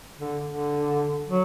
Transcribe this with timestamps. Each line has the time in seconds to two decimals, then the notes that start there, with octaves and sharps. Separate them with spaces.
0.18 D3
0.45 D3
1.29 F#3